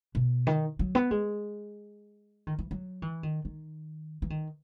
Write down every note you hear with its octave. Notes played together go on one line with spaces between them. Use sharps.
B2
D#3
F#3
B3
G#3
D#3
E3
F#3
E3
D#3
D#3
E3
D#3